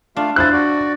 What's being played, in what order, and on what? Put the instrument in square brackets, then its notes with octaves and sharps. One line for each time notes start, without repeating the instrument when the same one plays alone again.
[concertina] A3 F4 F5 [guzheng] D4
[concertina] E4 F4 C5 [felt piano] F#6 A6
[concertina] F#4 D5